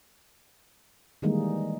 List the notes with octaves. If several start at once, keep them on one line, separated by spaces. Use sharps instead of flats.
D#3 E3 G3 G#3 A#3 D#4